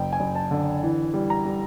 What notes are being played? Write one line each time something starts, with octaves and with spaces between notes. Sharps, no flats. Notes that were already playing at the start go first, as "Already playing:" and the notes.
Already playing: F#1 G5
G#5
F#1
A5
D3
E3
G3
A#5
G3